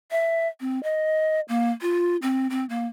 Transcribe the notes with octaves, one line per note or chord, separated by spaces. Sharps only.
E5
C4
D#5
A#3
F4
C4
C4
A#3